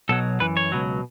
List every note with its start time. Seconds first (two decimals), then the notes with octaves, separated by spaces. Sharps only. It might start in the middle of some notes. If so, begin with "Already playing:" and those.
0.09 B1 B2 F#3 A4
0.40 F#2 E3 B4
0.57 C#5
0.72 C#2 B2 F#3